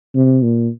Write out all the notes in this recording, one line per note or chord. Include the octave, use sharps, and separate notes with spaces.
C3
A#2